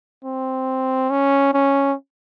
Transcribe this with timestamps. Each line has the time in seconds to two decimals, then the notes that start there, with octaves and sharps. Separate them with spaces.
0.24 C4
1.10 C#4
1.54 C#4